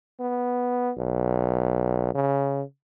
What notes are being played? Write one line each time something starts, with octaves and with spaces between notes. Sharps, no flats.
B3
B1
C#3